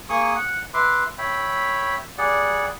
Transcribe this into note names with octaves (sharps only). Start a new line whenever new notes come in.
A#3 G#4 C#6 D#6
F#5
B4 E5 C6 D6
C#5 E5 G5 B5
G3 G#4 D5 F#5